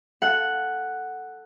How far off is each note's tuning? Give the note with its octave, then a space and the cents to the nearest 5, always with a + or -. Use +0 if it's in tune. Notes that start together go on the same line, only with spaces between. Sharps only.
A4 +0 F#5 +0